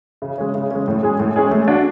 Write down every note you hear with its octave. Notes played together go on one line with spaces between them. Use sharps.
C#3
G#3 C#4
C#3
G#3 C#4
A2
G#3 C#4 G#4
A2
G#3 C#4 G#4
A3
D4 F#4